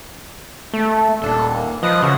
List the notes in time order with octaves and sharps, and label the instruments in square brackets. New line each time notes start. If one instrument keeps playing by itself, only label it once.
[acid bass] A3
[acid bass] D#1 [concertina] D4 A4
[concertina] A#3
[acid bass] F3 [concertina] B4 D#5 D#6
[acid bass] C#3 [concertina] F#4 E5 F#5